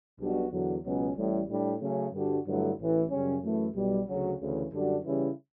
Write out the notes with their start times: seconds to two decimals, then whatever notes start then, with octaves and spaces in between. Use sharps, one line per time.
0.20 B1 B2 G3 D4 F#4
0.52 E2 D3 F#3
0.84 C#2 B2 F#3 C#4
1.16 A1 A2 G3
1.49 A2 G3 D4
1.81 C#3 F#3 A3 C#4
2.13 G2 D3 G3 D4 F#4
2.46 G2 D3 F#3 A3 E4
2.79 A1 A2 E3
3.10 F#2 C#3 G3 C#4
3.42 F#2 E3 A3 E4
3.74 B1 B2 G3
4.07 D2 C#3 F#3 C#4 F#4
4.39 D2 C#3 E3
4.71 F#2 D3 G3 D4 F#4
5.04 C#3 E3 G3 C#4 E4